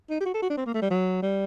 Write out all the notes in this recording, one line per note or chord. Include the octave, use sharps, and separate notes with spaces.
D#4
G4
F#4
A4
F#4
D4
C4
A#3
A3
G3
F#3
G3